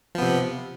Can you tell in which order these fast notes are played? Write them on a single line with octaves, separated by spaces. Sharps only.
F3 B3 C3